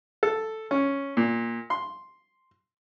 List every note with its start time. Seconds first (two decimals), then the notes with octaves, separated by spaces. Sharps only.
0.23 A4
0.71 C#4
1.17 A#2
1.70 C6